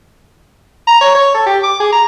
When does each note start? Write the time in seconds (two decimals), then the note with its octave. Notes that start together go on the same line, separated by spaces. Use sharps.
0.87 A#5
1.01 C#5
1.15 C#5
1.34 A4
1.46 G4
1.63 D6
1.80 G#4
1.92 A#5